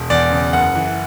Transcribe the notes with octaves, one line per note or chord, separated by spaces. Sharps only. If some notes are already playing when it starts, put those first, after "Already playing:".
Already playing: E1
E2 D5
C#3
F#1 F#5
E3